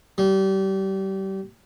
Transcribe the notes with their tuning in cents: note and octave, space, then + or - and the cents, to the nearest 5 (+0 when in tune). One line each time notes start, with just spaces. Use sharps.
G3 -30